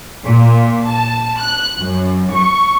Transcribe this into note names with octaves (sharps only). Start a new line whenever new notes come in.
A#2
A5
F#6
F#2
C#6